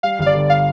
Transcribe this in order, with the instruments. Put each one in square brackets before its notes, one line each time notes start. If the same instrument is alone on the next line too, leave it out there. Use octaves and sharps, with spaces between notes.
[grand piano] G3 [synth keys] F5
[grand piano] G1 [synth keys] F5
[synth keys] D5
[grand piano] D3
[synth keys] F5